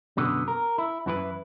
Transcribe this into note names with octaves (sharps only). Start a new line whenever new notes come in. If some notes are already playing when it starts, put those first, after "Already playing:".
F#2 B2 D3 B3
A#4
E4
F#2 E3 E4 A#4 B4